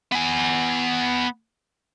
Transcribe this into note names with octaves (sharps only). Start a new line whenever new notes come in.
B3 G#5